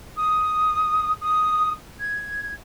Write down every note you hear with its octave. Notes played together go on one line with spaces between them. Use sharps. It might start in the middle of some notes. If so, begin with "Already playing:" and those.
D#6
D#6
G#6